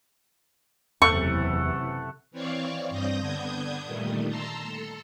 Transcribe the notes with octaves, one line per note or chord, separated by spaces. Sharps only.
F#1 E2 C3 E3 A3 F#5 C#6
E3 C4 C#5 D5 F5 C#6
G2 G3 C4 D#6 G6 A#6
D3 B3 D4 D#6 G6 G#6
A#2 D#3 G3 A3
A5 A#5 C6 E6
A4